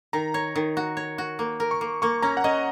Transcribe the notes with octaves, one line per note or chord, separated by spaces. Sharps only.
D#3 A#5
C#5
D#3
F#4
C#5
F#4
A#3
A#4
C#6
A#3
A#3 C#6
C#4 A#5
F#5
C#4 D#5